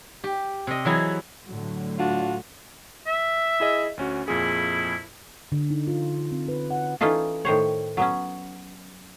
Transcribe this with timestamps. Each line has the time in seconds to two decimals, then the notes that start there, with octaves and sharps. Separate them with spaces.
0.24 G4
0.67 C3 D#5
0.85 E3 F#3 E4 G#4
1.48 A2 D3 F#3
1.98 D4 F4 F#4
3.07 E5
3.60 E4 G#4 D#5
3.97 D2 C#4 F#4
4.28 F2 A#2 E4 G#4
5.52 D3
5.70 D#4
5.87 F4
6.31 C4
6.48 B4
6.70 F#5
7.01 E3 C#4 D#4 F4 A4
7.45 A2 D#3 C5 C#5
7.97 F#3 B3 C#4